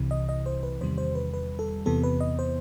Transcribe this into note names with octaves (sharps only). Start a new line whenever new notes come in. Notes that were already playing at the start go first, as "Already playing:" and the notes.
Already playing: C2 C3 E3
D#5
D#5
C5
B4
E2 C3 D#3 G3 C5
C5
B4
B4
A4
E2 C3 E3 B3 A4
B4
D#5
C5